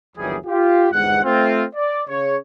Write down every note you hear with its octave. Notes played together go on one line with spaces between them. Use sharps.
G1 D#2 E3 F#3 G3 G#4
F4 G4
G1 E2 G#2 G#3 F#5
A3 C4 F4
D5
C#3 C#5